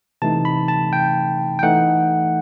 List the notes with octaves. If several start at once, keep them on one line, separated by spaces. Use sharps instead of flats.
C3 E3 A3 D#4 A5
B5
A5
G5
G5
E3 A3 D#4 F#5